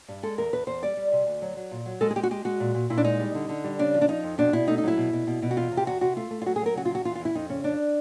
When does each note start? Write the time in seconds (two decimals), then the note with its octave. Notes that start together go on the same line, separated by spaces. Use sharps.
0.08 G2
0.23 G#3 A4
0.38 E2 A#4
0.53 E2 B4
0.67 E2 C5
0.82 G3 D5
0.97 G3
1.12 C3
1.27 D2
1.42 F#3
1.57 F#3
1.71 A#2
1.86 F#3
2.01 G#3 A4
2.11 G#4
2.16 G#3 G4
2.23 F#4
2.31 G#3 G4
2.45 G#3 F#4
2.60 A#2
2.75 A#2
2.90 A#2 E4
2.98 D4
3.04 G#3 D#4
3.19 G3
3.35 D3
3.49 D3
3.64 G3
3.79 C#3 D4
3.94 F3
4.01 D4
4.08 F3 D#4
4.23 F2
4.38 B2 D4
4.53 B2 E4
4.68 A3 D#4
4.78 D#4
4.83 F#3 E4
4.97 B2
5.13 B2
5.27 B2
5.42 B2
5.51 F#4
5.56 E2 F4
5.72 C3
5.77 G4
5.86 E2 F#4
6.01 C3 F#4
6.16 A3 F4
6.31 A3
6.42 F4
6.46 F#3 F#4
6.56 G#4
6.61 F#3 A#4
6.75 C#3 F#4
6.85 F4
6.90 E2 F#4
7.05 E3 F4
7.15 F4
7.20 E2
7.25 E4
7.35 F2 D#4
7.50 C#3 C#4
7.64 F2 D4